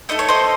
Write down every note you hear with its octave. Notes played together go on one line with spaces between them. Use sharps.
A3 D#4 A4 D#5
C#5
C5 D#5